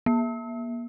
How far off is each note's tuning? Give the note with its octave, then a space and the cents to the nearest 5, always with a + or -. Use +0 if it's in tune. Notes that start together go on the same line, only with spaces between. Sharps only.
A#3 +35